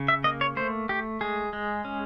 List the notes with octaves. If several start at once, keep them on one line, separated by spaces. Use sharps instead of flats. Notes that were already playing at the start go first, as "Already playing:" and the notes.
Already playing: C#3
E5
A#3 D#5
C#5
A3 C5
A3 G4
G#3 G#4
G#3
C#4